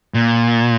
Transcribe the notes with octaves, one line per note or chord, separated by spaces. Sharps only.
A#2